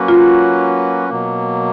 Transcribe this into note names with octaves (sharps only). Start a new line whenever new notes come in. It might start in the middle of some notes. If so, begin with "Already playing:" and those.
Already playing: F#3 A#3 C#4 F#4 B4
F4
B2 F#3 A#3